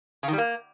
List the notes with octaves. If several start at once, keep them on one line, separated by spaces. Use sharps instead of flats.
C#3
D#3
G3
A#3